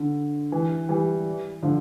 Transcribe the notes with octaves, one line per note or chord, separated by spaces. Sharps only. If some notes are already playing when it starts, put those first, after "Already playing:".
Already playing: D3
E3
E3 G3
D3 F3